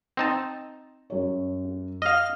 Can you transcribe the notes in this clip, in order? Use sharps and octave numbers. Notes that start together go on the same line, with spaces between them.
C4 D#4 A5
F#2 C#5
D#5 F5 F6